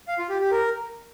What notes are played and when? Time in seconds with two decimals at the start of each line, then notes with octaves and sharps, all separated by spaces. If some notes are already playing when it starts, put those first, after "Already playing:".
0.08 F5
0.19 F4
0.29 G4
0.40 G4
0.51 A#4